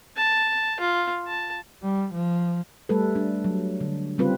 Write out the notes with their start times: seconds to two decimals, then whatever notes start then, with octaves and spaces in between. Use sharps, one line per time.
0.17 A5
0.80 F4
1.27 A5
1.82 G3
2.13 F3
2.89 G3 A3 A4 B4
3.15 D4
3.44 F#3
3.81 D3
4.18 C#3 G3 C4 F4 B4